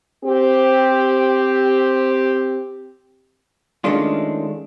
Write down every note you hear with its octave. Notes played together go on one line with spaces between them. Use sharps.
C4 G4
D#3 G#3 A3 C#4 D4 F4